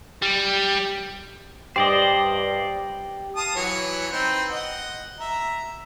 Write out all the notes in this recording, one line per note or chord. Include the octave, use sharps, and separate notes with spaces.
G3
G2 G4 C5 D5 D#5
F5 A5 D#6
E3 F#3 C#5
C4 D#4 B4
D#5 F#5
E5 A#5